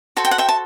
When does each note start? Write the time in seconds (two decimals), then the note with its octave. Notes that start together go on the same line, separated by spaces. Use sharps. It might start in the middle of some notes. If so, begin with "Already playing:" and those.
0.17 F#4 A4 C5 A5
0.25 G5
0.31 F#5
0.38 E5 G5
0.49 A5